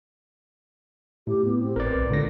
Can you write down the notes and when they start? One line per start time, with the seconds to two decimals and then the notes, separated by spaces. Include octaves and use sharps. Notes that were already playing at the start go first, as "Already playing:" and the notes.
1.27 A2 G4
1.44 B3
1.58 C4
1.76 G#1 A#4 B4 D5
1.94 B1
2.10 C#2 A2 D3 A#6